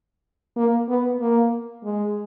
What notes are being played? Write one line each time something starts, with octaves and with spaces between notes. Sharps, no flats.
A#3
B3
A#3
G#3